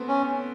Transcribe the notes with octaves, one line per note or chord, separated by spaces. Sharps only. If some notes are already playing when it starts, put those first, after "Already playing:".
Already playing: A3 B3 C4
C#4